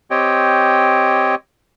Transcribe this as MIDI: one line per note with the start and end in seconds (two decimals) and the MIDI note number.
0.11 1.35 60
0.11 1.35 67
0.11 1.35 73
0.11 1.35 75
0.11 1.35 79